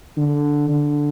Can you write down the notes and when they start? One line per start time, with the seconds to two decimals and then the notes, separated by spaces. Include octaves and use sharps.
0.17 D3
0.69 D3